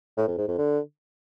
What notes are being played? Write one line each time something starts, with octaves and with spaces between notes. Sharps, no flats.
A2
F2
G#2
F2
D3